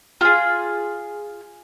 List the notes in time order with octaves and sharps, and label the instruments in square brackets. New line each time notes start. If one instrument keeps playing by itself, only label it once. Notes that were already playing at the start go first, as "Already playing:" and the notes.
[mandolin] F4 G#4